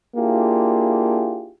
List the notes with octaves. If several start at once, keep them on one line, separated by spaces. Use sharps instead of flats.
A#3 D4 E4 F4 G4 G#4